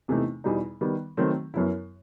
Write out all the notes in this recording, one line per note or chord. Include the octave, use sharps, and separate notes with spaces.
E2 C3 E3 A3 D#4
E2 B2 G3 D#4
D#3 G3 B3
D#3 F#3 A3 C4
F#2 F#3 B3 E4